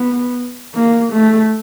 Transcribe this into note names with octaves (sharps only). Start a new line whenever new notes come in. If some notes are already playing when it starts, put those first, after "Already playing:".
Already playing: B3
A#3
A3